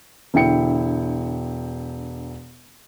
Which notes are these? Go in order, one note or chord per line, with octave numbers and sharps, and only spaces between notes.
E1 D3 E4 G5 C#7